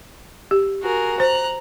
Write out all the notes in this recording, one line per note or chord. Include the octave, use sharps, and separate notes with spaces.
G4
F#4 G#4 A#4
C5 A#5 F#6